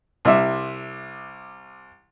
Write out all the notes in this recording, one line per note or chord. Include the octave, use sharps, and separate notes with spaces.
C2 C3 E5